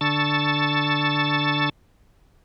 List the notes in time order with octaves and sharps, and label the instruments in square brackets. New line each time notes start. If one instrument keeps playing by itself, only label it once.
[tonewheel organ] D3 A5 C#6 E6 A6